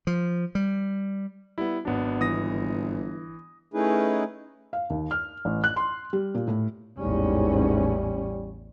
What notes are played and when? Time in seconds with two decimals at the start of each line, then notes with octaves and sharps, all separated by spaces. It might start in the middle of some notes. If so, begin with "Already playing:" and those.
0.07 F3
0.55 G3
1.58 G3 B3 E4
1.85 G#1 F#3 B3 D4
2.20 G1 E3 D#6 A#6
3.74 A3 C#4 D#4 E4 G#4 B4
4.73 F5
4.90 D#2
5.11 F6
5.45 A1
5.64 F#6
5.76 C6
6.13 G3
6.35 A#2
6.48 A2
6.99 A1 E2 G#2 G3 C#4